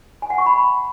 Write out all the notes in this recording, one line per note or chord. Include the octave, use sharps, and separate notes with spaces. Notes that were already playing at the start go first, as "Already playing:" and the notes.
G#5
F#5
C#6
B5